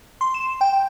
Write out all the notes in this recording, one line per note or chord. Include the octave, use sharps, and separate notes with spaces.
C6
E7
G5